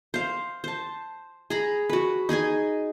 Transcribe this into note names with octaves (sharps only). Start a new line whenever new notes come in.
C5 F5
C5 A5
G#4 A#5 B5
F#4 B4
D#4 G#4 D#5 G#5